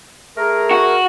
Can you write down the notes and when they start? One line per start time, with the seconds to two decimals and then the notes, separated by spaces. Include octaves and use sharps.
0.36 A3 G#4 A#4
0.71 F#4